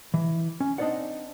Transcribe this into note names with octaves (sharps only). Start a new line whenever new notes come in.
E3
C#4
C4 D4 D#4 C5 D5 F#5